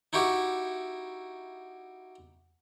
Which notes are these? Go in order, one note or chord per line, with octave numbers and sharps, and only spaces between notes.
D#4 E4 F#4 G4